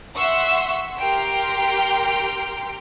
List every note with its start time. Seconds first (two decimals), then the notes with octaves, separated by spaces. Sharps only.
0.15 E5 F#5 C6 C#6 E6
0.99 G4 A#4 G5 C6 F6 D7